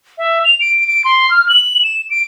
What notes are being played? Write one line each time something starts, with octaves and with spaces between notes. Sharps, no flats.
E5
F7
D7
D7
C6
F6
F#7
E7
D7